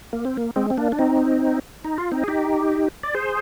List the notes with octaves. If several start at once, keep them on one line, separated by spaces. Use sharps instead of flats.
A#3
C4
A#3
G#3 C4
C4
A#3 D4
D4
C4 D#4
D#4
F4
C4 D#4
G#4
D#4 G4
D5
G#4 C5